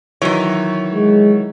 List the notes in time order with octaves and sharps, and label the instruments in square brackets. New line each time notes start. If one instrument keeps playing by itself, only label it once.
[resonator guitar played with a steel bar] D#3 E3 [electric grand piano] F#3 C#5
[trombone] G#3